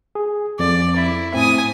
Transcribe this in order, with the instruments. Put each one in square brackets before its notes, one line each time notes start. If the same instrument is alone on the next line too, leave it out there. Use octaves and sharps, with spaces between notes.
[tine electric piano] G#4
[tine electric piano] F2 [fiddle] D5
[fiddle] E4
[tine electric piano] A2 C4 [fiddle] G#5 D#6